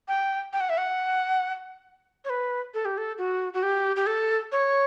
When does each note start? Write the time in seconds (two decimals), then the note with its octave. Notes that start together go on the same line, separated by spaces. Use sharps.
0.08 G5
0.53 G5
0.60 F#5
0.70 E5
0.78 F#5
2.25 C#5
2.30 B4
2.74 A4
2.85 G4
2.98 A4
3.18 F#4
3.54 F#4
3.63 G4
3.96 G4
4.07 A4
4.52 C#5